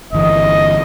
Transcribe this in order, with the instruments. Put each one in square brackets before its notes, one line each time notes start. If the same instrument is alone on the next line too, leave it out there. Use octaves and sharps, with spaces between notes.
[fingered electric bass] G1 E3 [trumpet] D#5